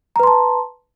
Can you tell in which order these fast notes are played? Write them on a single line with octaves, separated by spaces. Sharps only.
A#5 B4 C6 A5